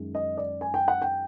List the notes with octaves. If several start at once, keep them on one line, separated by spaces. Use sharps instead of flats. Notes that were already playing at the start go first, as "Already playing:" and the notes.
Already playing: F#2 D#3 G#3
D#5
D5
G#5
G5
F#5
G5